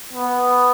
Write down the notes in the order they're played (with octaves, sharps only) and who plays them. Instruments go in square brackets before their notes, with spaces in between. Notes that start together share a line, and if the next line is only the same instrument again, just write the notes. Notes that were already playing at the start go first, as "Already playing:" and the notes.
[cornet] B3